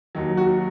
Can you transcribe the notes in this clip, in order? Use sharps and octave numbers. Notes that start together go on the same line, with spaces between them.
D#2 D#3 F#3
F#4